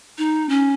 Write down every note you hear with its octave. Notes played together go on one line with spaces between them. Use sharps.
D#4
C#4